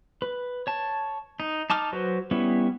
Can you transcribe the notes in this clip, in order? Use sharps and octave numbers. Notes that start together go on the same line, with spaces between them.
B4
C#5 A5
D#4
D#4 A5 D6 F6
F#3 F#4 B4 C5
G3 B3 C#4 E4